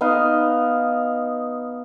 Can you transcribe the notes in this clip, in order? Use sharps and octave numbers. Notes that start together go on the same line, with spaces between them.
B3 D#4 D#5 F5